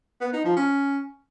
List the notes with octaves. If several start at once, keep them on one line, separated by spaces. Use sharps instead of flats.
B3
D#4
F3
C#4